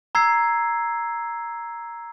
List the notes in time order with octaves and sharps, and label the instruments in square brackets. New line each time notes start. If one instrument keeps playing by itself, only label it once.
[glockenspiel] A#5 E6 G#6 C7